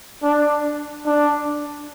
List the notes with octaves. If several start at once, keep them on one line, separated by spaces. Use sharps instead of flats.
D4
D4